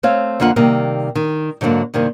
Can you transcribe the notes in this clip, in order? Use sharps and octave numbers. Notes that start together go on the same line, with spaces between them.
A3 C4 C#5 F5
F2 D3 A#3 F4 F#5
C3 D#3 G3 A#3
D#3
G#2 D3 F#3 A3 A#3
G2 C3 D#3 A#3